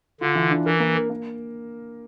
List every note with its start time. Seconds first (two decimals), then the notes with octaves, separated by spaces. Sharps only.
0.21 D3 F4
0.35 E3
0.50 D4
0.65 E3 A#4
0.80 A#3
0.95 A#4
1.10 A#3